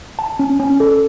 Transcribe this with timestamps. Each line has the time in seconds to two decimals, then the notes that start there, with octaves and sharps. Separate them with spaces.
0.19 A5
0.39 C#4
0.60 C#4
0.80 A4